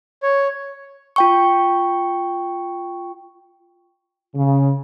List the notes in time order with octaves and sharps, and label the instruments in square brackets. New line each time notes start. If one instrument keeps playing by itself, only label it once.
[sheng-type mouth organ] C#5
[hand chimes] F4 G5 C#6
[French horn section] C#3